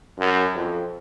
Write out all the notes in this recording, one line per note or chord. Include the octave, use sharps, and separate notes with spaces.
F#2
F2